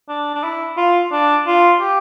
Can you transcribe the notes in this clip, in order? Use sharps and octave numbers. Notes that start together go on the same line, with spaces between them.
D4
D4
E4
F4
D4
F4
G4